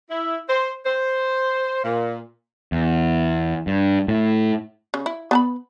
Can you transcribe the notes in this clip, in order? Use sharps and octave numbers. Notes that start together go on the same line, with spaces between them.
E4
C5
C5
A#2
E2
G2
A2
C#3
E4
B3 A5 B5